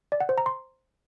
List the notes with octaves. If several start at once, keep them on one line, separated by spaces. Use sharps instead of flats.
D5
F#5
C5
A#5
C6